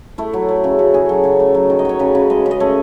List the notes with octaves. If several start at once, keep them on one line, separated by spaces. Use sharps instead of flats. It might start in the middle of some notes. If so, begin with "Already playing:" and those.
A3 E4
F#3
A3
C#3
A3 F#4
C#3 G#4
F#3 A4
C#3 C#5
A3
F#3
D#3
D#5
F#3 C#5
C#3 B4
C#3
G#3 D#5
C#3
D#5
A3 C#5